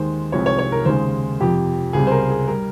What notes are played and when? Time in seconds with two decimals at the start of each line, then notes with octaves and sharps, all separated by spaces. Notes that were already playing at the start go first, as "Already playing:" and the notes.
Already playing: D#2 D#3 G#3 C5
0.32 C2 C3 F3 G#3 C#5
0.46 C#5
0.59 C#5
0.72 A#4
0.85 D#2 C#3 G#3 C5
1.41 F2 C3 F3 G4
1.93 C#2 C3 G3 G#4
2.07 C5
2.11 A#4
2.30 G#4
2.47 G3 A#4